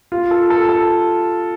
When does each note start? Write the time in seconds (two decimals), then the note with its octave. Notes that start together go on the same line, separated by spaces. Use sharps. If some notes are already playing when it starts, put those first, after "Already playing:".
0.12 F4
0.31 A4
0.50 A4
0.69 A4